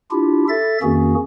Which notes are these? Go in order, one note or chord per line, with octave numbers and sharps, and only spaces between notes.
D4 E4 F4 G4
A4 E5 A6
F2 D#3 A#3 C#4 F#4 G#4